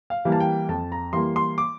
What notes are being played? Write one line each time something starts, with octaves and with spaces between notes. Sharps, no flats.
F5
E3 G3 A#3
A5
G5
F2 A5
A#5
E3 G3 A#3 C6
C6
D6